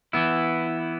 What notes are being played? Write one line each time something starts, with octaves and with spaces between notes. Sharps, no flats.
E3 B3 E4